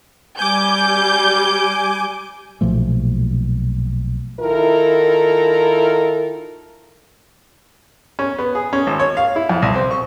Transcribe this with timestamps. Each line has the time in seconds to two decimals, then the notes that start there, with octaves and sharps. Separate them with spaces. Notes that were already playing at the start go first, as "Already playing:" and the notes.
0.39 G3 G#5 D6 G6
2.61 B1 A#2 F3 A3
4.40 D#3 E4 F4 A4 A#4
8.19 C#4
8.38 B3
8.55 G#4
8.73 C#4
8.87 G#1
8.99 C#5
9.17 F5
9.36 E4
9.49 F2
9.62 C2
9.75 C4
9.91 C#6